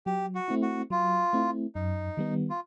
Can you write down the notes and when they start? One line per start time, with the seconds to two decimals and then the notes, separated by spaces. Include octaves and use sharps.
0.06 F#3 G4
0.35 F#4
0.48 A3 C4 E4
0.62 F#4
0.90 F#3 F4
1.33 A3 C4 E4
1.75 F#2 D#4
2.17 D#3 G3 B3
2.50 F4